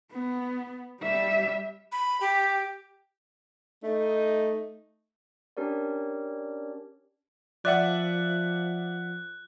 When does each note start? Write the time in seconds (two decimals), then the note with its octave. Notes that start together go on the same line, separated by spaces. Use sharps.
0.12 B3
1.01 G3 E5
1.92 B5
2.21 G4
3.83 A3 D#4
5.57 C#4 D4 G4 A#4 C#5 D5
7.65 F3 D5 E5 F#5 F#6